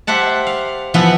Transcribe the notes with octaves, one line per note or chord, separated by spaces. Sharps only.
G4 C5 E5 F#5 A5
F5
E3 F3 B3 E5 F#5